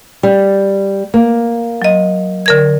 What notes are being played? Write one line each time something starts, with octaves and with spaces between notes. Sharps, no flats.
G3
A#3
F#3 D#5
D3 A#4 G#6